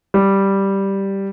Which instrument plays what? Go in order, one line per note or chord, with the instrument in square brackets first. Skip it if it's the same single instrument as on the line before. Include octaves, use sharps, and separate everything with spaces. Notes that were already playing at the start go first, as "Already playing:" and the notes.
[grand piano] G3